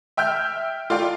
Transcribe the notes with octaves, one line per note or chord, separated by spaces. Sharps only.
E5 G5 E6 F6 G6
F4 A4 D5 F5 G5